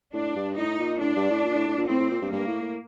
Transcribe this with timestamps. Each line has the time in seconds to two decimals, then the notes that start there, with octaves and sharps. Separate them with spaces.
0.13 A2 D4
0.36 G2
0.57 A2 D#4
0.79 A#2
1.01 A2 D4
1.16 G2
1.30 A2
1.45 A#2
1.56 A2
1.67 A2
1.78 A#2
1.88 A2 C4
2.00 A2
2.11 A#2
2.22 G2
2.32 G2 A#3
2.47 A2
2.62 A2